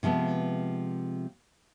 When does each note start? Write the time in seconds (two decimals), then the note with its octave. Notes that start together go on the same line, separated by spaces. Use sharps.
0.03 C3 F3 G#3 B3